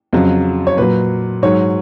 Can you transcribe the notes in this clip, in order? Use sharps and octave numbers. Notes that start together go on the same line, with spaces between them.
F2 C#3 F#3
C#5
A#2 F#3 B4
G#2 F#3 C#5